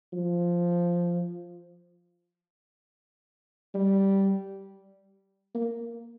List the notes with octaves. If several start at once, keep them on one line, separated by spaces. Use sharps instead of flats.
F3
G3
A#3